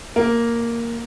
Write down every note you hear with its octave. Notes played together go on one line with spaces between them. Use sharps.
A#3